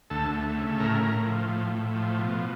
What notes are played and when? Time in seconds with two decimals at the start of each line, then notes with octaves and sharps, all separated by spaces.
0.10 D2 A4
0.34 A3
0.57 C#3
0.80 A2 A#4
1.03 A2
1.26 F3
1.49 A2
1.72 A2
1.95 F3
2.19 B2